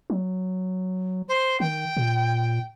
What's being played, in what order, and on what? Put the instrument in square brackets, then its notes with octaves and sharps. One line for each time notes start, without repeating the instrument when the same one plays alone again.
[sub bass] F#3
[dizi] C5
[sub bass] D#3 [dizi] G5
[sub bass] A#2